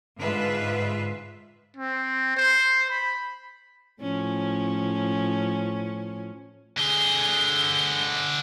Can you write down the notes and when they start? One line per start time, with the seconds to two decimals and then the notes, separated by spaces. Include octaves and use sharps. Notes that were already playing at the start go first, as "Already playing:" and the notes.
0.19 G#2 D3 F4 B4 E5
1.76 C4
2.37 C5
2.90 B5
4.01 A2 F3 C#4
6.78 D3 G#4 G7